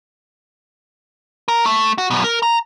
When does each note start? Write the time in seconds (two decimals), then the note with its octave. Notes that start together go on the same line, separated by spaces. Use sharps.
1.48 A#4
1.66 A3
1.98 F#4
2.10 F#2 B2
2.24 A#4
2.43 A#5